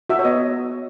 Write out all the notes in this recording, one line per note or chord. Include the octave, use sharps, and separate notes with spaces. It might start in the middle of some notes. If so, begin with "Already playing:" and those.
F#4 E5
C#5
B3 D#5